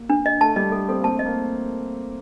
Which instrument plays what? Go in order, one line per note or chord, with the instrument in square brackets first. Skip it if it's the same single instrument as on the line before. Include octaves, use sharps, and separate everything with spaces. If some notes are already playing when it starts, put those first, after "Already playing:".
Already playing: [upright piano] A#3
[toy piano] D4
D#5
[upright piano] A3 [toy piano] A5
[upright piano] G3 [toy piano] D#5
[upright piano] A3 [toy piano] A4
[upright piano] C4 [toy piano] A4
[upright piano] A#3
[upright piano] C4 [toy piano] A5
[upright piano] A3 [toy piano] D#5
[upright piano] A#3